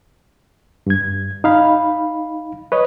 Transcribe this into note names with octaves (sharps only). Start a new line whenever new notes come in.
G2 G#6
D#4 F5 B5
B4 C#5 D#5